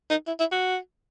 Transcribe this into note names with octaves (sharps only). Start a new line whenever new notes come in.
D#4
E4
E4
F#4